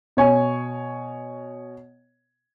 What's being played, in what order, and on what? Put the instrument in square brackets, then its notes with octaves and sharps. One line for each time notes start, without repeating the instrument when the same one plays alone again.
[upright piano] B2 C#5 G#5